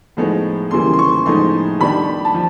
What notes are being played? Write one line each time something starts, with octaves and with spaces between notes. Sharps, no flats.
A2 F3 G#3 B3 D#4
E2 C#3 E3 G3 A#3 C6
C6
C#6
A2 F3 G#3 B3 D#4 C6
D#3 G3 B3 D4 B5
A5
F3